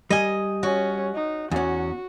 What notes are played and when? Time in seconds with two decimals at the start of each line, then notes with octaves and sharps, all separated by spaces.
0.10 G3 D#5 G#5
0.63 C#4 F#4
1.15 D#4
1.51 E2 C#4 F#4